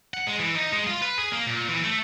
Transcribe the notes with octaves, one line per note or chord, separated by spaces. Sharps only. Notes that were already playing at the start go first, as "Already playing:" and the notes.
F#5
G#3
E3
D#4
G#3
F4
B4
G#4
A#3
A#2
E3
A3